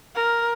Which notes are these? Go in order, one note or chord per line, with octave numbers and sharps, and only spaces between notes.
A#4